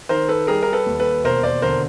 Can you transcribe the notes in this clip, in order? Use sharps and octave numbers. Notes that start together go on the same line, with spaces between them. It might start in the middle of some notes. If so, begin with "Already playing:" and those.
D#3 A#4 C5
A4 B4
G3 G#4 A#4
A#4
A4 B4
D#2
A4 B4
E1 A#4 C5
C5 D5
D3 A#4 C5